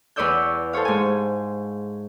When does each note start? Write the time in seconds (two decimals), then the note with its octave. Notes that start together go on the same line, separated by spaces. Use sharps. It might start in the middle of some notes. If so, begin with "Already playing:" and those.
0.16 E2 B4 C#5 D5 E6 G6
0.73 A4 C5 C#5 F5
0.85 G#2 G#5